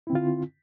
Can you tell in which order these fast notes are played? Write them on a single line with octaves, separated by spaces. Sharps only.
E4 C4 D3 F4